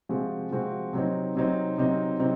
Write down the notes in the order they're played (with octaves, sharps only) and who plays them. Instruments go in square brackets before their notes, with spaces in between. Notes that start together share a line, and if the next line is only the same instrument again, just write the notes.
[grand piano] C3 F3 G#3 C4 F#4
C3 F3 G#3 C4 F#4
C3 F#3 C4 D#4
C3 F#3 C4 D#4
C3 F#3 C4 D#4
C3 F#3 C4 D#4